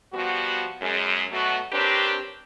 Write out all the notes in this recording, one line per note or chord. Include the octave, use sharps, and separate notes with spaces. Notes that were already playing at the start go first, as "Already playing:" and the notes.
F3 G3 B3 F#4
F#2 G#3
B2 F#3 A3 B3 F#4
C4 D4 G4 A#4 B4 C#5